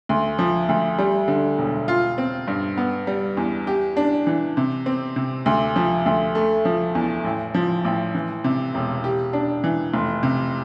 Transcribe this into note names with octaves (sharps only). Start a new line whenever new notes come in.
D2
F3
D2
G3
D3
E1
F4
C4
G2
B3
G3
E2
G4
D4
E3
C3
C4
C3
D2
F3
D2
A3
F3
E2
A1
F3
A1
E3
C3
E1
G4
D4
E3
F1
C3